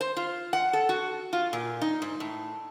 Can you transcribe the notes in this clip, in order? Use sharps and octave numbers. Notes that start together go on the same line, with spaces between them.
C5
F4
F#5
A4
F#4
F4
A#2
D#4
G#2
A2